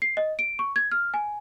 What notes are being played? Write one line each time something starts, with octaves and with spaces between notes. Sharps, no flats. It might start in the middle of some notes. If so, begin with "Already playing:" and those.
C7
D#5
D7
C#6
G#6
F6
G#5